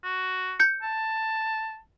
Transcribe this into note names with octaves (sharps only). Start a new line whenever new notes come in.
F#4
G6 C#7
A5